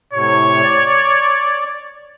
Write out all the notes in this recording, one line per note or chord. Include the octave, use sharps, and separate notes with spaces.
A2 C3 C#5
D5